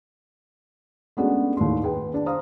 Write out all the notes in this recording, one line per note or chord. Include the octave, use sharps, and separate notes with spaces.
G#3 A3 B3 C#4 D4 F#4
D#2 A2 C6
G#4 B4 G5
D4
C5 F5 A#5 D#6